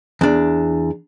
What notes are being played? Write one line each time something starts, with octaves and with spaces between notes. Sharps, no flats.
E2 D4